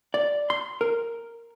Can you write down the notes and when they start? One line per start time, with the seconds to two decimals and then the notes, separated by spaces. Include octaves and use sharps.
0.14 D5
0.50 C6
0.81 A#4